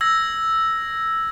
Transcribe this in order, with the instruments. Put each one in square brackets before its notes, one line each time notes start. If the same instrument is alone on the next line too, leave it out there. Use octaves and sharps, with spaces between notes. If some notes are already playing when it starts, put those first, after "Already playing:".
[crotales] E6 G#6 A#6